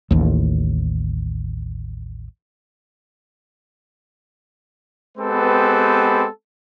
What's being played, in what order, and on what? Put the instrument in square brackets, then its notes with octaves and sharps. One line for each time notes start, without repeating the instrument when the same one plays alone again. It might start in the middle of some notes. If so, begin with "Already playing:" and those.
[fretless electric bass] A1 D#2
[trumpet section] G#3 B3 C4 G4 A4 B4